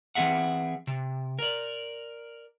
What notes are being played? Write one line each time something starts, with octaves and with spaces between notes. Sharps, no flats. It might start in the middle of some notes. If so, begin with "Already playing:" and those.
E3 C4 C#4 G#4 E5 F#5
C3
A#4 D5